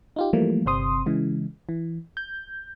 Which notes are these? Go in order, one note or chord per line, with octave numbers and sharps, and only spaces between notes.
D#4 F4 G4
E3 F3 G3 A3 A#3
G1 C3 C4 C6 D#6
C#3 E3 G#3
E3
G6